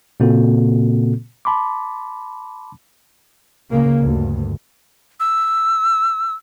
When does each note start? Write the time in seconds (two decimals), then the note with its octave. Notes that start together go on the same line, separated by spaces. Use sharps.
0.20 A#2 C#3 A#3 C4 F#4 A4
1.45 A5 B5 C6 D6
3.70 C#2 C#3 A#3
4.01 D2 G2
5.20 E6